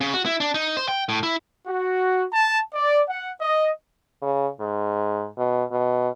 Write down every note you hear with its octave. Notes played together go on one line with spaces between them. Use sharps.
C#3
F#4
E4
D4
D#4
C5
G5
A2
E4
F#4
A5
D5
F#5
D#5
C#3
G#2
B2
B2